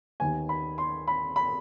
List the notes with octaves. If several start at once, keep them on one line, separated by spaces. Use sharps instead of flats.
D#2 D#3 B3 G#5
B5
C6
B5
B5